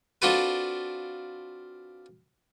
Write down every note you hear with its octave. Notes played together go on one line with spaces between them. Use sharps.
C4 D4 F4 F#4 A4 B4